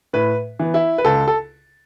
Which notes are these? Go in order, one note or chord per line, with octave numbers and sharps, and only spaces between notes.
A2 B4
E3 B3
E4
B4
C#2 A4
A4